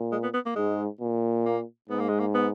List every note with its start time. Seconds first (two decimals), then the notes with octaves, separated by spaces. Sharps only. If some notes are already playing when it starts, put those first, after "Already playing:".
Already playing: A#2
0.12 G#3
0.23 B3
0.34 B3
0.46 A#3
0.56 G#2 G#3
1.01 A#2
1.46 A#3
1.89 G#2 B3
2.00 A#3
2.09 G#3
2.20 A#3
2.34 B3